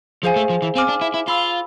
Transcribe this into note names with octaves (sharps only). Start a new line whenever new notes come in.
F3 G#4 C5 F5 G#5
A3
F3
E3
C4 F5 G#5 D6 F6
D4
E4
E4
F4 F5 B5 E6